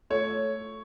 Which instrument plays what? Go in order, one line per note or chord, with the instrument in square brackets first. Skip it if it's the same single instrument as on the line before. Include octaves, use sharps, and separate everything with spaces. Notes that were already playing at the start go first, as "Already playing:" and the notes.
[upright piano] A3 C#5